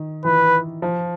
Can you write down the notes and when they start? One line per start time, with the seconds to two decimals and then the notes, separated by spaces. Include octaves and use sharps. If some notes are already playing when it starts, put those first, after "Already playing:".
Already playing: D#3
0.25 E3 B4
0.82 F3